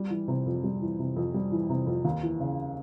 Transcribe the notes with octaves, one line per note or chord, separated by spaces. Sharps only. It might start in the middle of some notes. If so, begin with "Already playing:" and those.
Already playing: G3
E3
C3
F2
G3
E3
C3
F2
G3
E3
C3
F2
D#2
E3
C#3